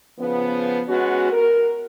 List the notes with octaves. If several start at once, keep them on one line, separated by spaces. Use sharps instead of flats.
C#3 F3 B3
G#3 B3 C#4 F#4
A#4